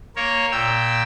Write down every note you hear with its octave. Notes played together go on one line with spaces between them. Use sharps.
A#3 A#4 C#5
A#2 G5 E6